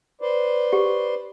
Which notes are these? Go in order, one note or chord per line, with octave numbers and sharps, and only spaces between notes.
B4 C5 D5
G4